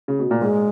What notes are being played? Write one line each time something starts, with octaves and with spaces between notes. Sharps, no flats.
C#3
B2
A#2
G#2 G#3